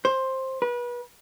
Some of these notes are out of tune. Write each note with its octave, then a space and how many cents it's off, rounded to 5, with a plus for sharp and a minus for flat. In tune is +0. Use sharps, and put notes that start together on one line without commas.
C5 +10
B4 -30